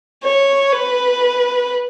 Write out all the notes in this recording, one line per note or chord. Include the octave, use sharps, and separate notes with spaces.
C#5
B4